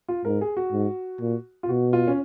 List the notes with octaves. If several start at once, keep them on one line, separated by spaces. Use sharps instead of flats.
F4
G#2 A#4
G#4
F#4
G#2
A#2
F4
B2 F#4
F4
C#4